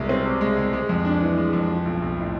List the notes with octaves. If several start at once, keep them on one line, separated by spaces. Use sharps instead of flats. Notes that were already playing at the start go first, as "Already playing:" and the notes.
Already playing: C2 B2 G#3
C4
C3
G#3
C2
G#3
F2
D4
E3
G#3
F2
F3
B1
B1
A2